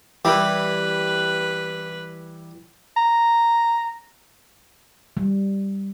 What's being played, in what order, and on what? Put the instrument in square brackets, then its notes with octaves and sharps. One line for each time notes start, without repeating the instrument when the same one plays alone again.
[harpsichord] E3 G3 [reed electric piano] E4 G4 [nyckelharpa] B4
[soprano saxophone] A#5
[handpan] G3